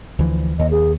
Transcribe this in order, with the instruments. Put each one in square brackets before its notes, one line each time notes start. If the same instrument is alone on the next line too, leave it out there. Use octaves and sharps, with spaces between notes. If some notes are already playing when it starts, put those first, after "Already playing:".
[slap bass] D2 E3 F3
[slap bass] D#2 [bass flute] D#5
[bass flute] G#4